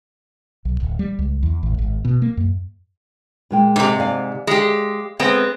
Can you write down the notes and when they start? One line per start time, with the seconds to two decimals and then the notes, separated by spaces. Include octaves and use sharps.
0.65 B1
0.80 D1
0.99 G3
1.19 C#2
1.43 E2
1.63 A1
1.79 G#1
2.05 B2
2.22 A#3
2.37 F#2
3.51 A#2 G#3 G5
3.76 G#2 C3
3.99 D5 F5 G#5
4.47 G#3 G4
5.19 G#3 B3 C4